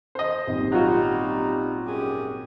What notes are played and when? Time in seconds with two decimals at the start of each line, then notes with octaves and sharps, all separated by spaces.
0.15 C5 D#5
0.47 D#1 G#1 D#3
0.72 F#3 G3 D#4 F4 F#4
1.86 F#2 G4 G#4